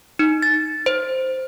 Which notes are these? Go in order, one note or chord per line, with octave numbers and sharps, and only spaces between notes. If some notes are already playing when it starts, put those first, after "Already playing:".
D#4
A6
C5